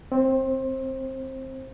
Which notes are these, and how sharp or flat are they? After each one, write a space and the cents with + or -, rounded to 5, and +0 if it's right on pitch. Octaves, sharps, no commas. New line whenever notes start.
C4 +0 C5 +25